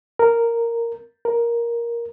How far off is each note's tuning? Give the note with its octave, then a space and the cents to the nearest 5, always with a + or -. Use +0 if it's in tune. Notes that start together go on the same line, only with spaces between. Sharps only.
A#4 -5
A#4 +10